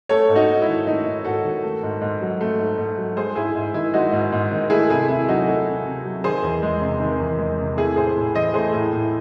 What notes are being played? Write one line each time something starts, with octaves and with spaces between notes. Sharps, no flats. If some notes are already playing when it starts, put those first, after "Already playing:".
A3 A4 C#5
G#2
D#4 F#4
G#2
E4
D#3
A3 D#4
G#2
G#2 F#4 A4
D#3
A3
G#2
G#2
F#3
A3
G#2
G#2
F#3
G#3 G#4 C5
G#2 E4 G#4
G#2
D#3 E4
G#3 D#4 F#4
G#2
G#2
D#3
A3 E4 G#4
C3 E4 G#4
C3 E4
F#3 D#4 F#4
A3 F#4 A4
C3
C3
F#3
D#3 G#4 C5
E2
G#3
C3
D#3
E2
G#3
C3
A3 E4 G#4
A2 G#4 C5
A2
E3 C5 D#5
A3 G#4 C5
A2
A2